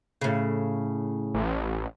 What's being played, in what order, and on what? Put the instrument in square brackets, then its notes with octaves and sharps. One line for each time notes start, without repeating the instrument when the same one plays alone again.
[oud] A2 C#3
[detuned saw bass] A1